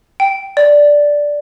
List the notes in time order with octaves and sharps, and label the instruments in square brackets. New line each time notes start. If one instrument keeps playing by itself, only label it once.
[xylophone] G5
D5